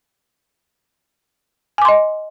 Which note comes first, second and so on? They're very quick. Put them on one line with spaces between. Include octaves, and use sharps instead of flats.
G#5 D6 C6 D#5